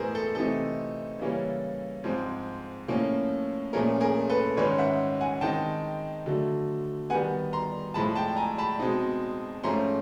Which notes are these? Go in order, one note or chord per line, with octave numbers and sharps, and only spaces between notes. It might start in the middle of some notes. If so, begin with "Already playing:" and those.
Already playing: A2 E3 G#3 B3 G#4 A#4 C5
A4
C3 E3 A3 C4 D#4 A4
C#3 E3 G3 A#3 C#4
G#2 F3 G#3 C4
A2 F3 A#3 C#4
A#2 F3 A3 C#4 G#4 A#4
G#4 A#4
A4 B4
G#2 D#3 G#3 C#4 B4 C#5
E5 F#5
F#5 G#5
D#3 G#3 C4 D#4 G5 A5
D3 F#3 A3
D#3 G3 B3 F#5 G#5
A#5 C6
A2 F3 G#3 A5 B5
G5 A5
G#5 A#5
A5 B5
B2 G#3 C4 D#4
G#2 F3 A3 C#4 A#5 C6